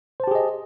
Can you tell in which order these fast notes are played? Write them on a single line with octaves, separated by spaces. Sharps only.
C5 A5 G4 G#4 D#5